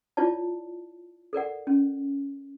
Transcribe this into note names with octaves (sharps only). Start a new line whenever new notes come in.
E4 F4 C#5 D5 A5
A4 A#4 D5 F#5
C#4